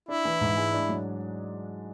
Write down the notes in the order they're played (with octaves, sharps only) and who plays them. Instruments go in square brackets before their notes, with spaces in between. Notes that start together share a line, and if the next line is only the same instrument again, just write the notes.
[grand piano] D4 [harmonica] E4
[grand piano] E3
G#2
G#3
D4
F#3